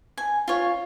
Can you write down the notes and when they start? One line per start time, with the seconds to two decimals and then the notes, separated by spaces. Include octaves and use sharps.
0.18 G#5
0.48 F4 C#5